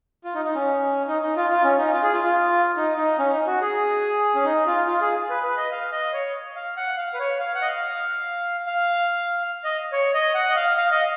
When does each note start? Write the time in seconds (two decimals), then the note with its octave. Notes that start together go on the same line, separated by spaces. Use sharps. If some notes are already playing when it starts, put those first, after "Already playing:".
0.24 F4
0.35 D#4
0.45 D#4
0.55 C#4
1.08 D#4
1.22 D#4
1.36 F4
1.50 F4
1.64 C#4
1.78 D#4
1.93 F4
2.03 G#4
2.13 F4
2.24 F4
2.76 D#4
2.97 D#4
3.19 C#4
3.32 D#4
3.47 F#4
3.61 G#4
4.35 C#4
4.45 D#4
4.66 F4
4.87 F4
5.01 G#4
5.29 B4
5.43 B4
5.57 D#5
5.71 F5
5.92 D#5
6.13 C#5
6.55 F5
6.77 F#5
6.98 F5
7.14 B4
7.19 C#5
7.40 F5
7.54 F#5
7.62 D#5
7.68 F5
8.66 F5
9.64 D#5
9.92 C#5
10.14 D#5
10.34 F#5
10.49 D#5
10.56 F5
10.77 F5
10.91 D#5